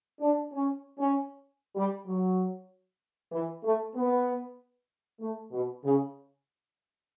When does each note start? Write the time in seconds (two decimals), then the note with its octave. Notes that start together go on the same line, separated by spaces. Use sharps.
0.19 D4
0.51 C#4
0.98 C#4
1.75 G3
2.07 F#3
3.32 E3
3.63 A3
3.95 B3
5.20 A3
5.52 B2
5.83 C#3